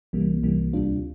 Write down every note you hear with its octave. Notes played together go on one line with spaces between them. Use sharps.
C2 C3 E3 G3 A#3
C2 C3 E3 G3 A#3
D2 C3 G3 D4 F4